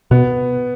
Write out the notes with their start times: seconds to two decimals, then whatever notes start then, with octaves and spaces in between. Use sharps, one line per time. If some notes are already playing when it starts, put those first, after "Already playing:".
0.11 B2 B3